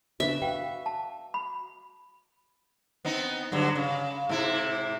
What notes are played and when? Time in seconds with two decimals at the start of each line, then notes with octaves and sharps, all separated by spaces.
0.20 C#3 D4 B4 E5
0.42 F#4 B4 F5 G5
0.86 A5
1.34 B5
3.05 B3 C4 D#4
3.52 G2 D3 F#3
3.76 C#3
4.29 G#2 C3 E4